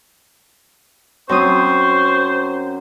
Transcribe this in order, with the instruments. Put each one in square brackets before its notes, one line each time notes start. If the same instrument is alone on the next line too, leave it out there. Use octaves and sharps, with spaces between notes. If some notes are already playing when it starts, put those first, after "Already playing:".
[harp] F#2 C4 D#6 [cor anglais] C5 [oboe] C#6